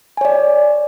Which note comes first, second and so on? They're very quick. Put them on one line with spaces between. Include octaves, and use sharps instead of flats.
G#5 C#5 D5